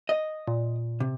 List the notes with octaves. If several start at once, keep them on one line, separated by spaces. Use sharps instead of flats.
D#5
A#2
C3